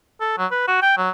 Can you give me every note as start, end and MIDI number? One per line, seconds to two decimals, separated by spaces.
0.20 0.38 69
0.38 0.46 54
0.51 0.65 71
0.67 0.78 66
0.82 0.93 79
0.98 1.10 54